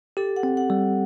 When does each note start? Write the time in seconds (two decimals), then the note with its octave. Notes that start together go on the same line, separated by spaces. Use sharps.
0.17 G4 A4
0.36 F#5
0.43 C4
0.57 F#5
0.70 G3